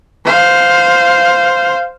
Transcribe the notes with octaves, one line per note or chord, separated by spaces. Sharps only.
C5 F5